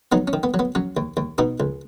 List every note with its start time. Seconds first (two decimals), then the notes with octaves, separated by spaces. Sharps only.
0.12 F#3 B3 D#4
0.28 C#4
0.33 D#3
0.43 B3
0.54 F#3
0.59 B3
0.75 F#3 C#4
0.97 D#2
1.17 D#2
1.38 B2 B3 D#4
1.60 C#2